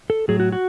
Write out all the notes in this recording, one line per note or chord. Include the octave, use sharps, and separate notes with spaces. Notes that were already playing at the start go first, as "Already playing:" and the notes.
A4
A2 F#3 G#4
F#4
F#4